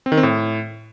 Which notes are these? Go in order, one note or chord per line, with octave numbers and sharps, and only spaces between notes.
C4
D#3
C4
A2